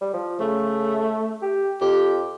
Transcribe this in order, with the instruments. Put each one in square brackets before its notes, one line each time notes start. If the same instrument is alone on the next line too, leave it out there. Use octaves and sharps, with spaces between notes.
[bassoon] G3
F3
[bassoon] C#3 [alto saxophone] A3
[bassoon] G4
[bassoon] F2 [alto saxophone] G4